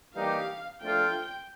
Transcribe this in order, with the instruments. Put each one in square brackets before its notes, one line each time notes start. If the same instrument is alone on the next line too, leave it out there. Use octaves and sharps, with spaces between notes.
[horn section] E3 G3 A#3 D#4 G4 [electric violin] F5
[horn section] F3 A3 D4 F4 A4 [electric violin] G5